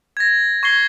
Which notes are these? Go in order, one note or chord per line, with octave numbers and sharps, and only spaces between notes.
G#6 A#6
C#6 G#6 C7 G7